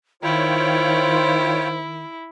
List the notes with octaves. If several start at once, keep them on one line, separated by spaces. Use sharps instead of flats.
D#3 E4 F4 C5 C#5 G5